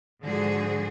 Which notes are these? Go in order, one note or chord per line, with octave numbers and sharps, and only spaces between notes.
G#2 D3 F3 F#4 G#4